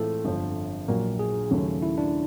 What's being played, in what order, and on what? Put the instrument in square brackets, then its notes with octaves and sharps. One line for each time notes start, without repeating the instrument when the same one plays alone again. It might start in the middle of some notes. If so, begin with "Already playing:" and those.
Already playing: [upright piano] A2 E3 G#3 C4 F4 [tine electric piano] A4
[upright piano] G1 F2 D3 F3
A#1 A#2 F#3 A#3
[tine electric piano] G#4
[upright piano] D#2 C#3 F#3 A3 C#4
[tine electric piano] E4
D4